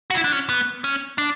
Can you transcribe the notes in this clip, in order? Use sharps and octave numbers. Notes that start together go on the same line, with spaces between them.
F#4
E4
D4
C#4
B3
C#4
D4